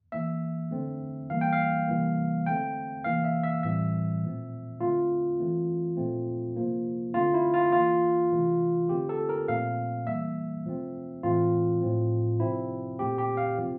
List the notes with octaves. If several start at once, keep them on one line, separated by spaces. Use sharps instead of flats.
E3 A#3 E5
D3 A3 C4
E3 G3 A#3 F5
G5
F5
C3 E3 G3 A#3
D3 A3 C4 G5
C3 E3 A#3 F5
E5
E5
A2 E3 G3 C4 E5
A#2 F3 A3 C4
D3 A3 C4 F4
E3 A3 C4
A#2 F3 A3 C4
C3 F3 A#3
D3 A3 C4 F4
E4
F4
E3 A#3 F4
C3 E3 A3
D3 A3 C4 G4
A4
A#4
A#2 F3 A3 C4 F5
E3 G3 A#3 E5
C3 F3 A3 C4
A2 E3 A3 C4 F4
A2 F3 C4
C3 F3 C4 E4
A#2 A3 C4 G4
G4
F5
C3 F3 C4